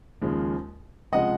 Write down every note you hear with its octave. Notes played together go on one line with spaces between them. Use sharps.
D#2 C#3 F3 G#3
C#2 C3 F3 G#3 D#5 F#5